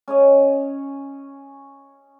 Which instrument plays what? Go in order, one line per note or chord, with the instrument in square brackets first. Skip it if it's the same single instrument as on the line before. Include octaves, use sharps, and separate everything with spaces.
[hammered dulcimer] C#4 C#5 D#5